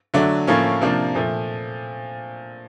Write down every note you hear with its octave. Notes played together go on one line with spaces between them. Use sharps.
D3 F#3 A3 D4
A2 F3 A#3 C#4
C3 F3 A#3 D4
A#2 F3 A3